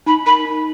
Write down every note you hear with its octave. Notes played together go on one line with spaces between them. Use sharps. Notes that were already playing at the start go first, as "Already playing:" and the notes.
D#4 B5
A#4 B5
D#4